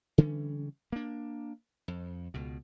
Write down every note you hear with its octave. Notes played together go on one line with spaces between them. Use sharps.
C#3 E3 G3 C#4
A#3 D4
F2
C#2 B2